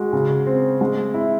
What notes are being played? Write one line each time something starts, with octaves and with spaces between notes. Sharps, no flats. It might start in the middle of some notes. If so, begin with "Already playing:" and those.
Already playing: G#3 F#4
C#3
C4
G#3
E4